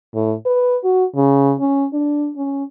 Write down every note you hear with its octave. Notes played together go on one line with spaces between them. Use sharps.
A2
B4
F#4
C#3
C#4
D4
C#4